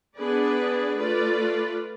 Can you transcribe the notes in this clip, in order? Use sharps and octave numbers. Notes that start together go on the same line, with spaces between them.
B3 D4 G#4 B4 D5
A3 F4 B4 D5